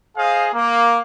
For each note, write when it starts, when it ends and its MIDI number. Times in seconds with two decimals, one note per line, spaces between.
0.17 0.48 68
0.17 0.48 72
0.17 0.48 75
0.17 0.48 77
0.53 0.99 58